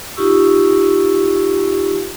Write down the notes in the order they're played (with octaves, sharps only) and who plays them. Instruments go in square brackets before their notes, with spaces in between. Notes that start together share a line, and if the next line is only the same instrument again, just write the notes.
[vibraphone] D#4 F4 G4 C#6 E6